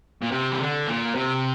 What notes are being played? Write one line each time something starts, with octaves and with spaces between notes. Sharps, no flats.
A#2
C3
E3
D3
A#2
C3